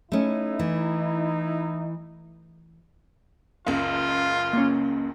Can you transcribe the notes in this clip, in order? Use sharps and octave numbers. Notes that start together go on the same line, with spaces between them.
A3 C#4 D#4 E4
E3
F#1 C#2 F4 F5
A#3 C#4